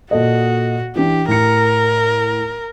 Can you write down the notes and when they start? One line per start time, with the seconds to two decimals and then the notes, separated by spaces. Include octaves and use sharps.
0.11 A#2 F#4 A4 D#5
0.96 E3 D4 G4
1.28 A2 A#4 C#7